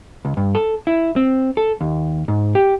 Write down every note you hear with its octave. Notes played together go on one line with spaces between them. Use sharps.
C#2
G2
A4
E4
C4
A4
D#2
G#2
G4